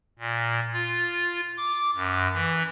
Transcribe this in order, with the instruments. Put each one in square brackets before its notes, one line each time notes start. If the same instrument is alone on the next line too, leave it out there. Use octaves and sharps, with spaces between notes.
[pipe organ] A#2
F4
D6
F#2
E3